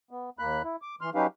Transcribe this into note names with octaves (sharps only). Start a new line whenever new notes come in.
B3
D#2 A#3 B5 F#6
E4
D6
E3 C6 F6
F#3 C#4 D#4 G4 B4 F5